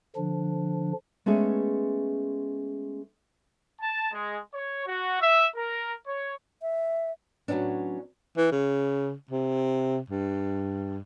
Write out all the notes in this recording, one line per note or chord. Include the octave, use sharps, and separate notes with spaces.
D3 F3 D4
G#3 A3 B3 C#4 G#4
A5
G#3
C#5
F#4
E5
A#4
C#5
E5
A2 F#3 B3 C#4 D4
E3
C#3
C3
G2